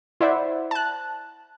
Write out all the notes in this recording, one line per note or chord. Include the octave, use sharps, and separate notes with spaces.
E4 C5 D5 E5 F#5
A5 F#6